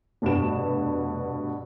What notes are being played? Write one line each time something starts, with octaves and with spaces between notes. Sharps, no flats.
F1 G2 B2 B4 E7